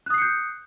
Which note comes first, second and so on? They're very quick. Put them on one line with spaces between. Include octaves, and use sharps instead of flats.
F#6 D#6 C7 C#7 G6